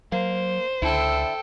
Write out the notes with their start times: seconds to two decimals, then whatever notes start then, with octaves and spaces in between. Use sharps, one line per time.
0.12 F#3 A#3 C5
0.82 C#2 D3 E4 A4 G5